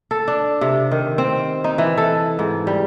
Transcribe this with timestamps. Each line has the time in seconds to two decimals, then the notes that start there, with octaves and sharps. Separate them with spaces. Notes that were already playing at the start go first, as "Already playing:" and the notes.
0.11 A4
0.28 D4
0.61 C3
0.91 D#3
1.18 C4
1.64 D#4
1.78 E3
1.97 A4
2.39 G#2
2.67 G3